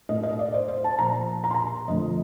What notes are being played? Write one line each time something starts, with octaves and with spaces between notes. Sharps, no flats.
A2 A3 D#5
D#5
D5
C5
C5
A5
A#2 F3 A#3 A#5
A#5
C6
A#5
F2 D3 F3 A3 D#5